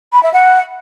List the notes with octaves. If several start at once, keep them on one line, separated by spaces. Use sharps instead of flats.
B5
E5
F#5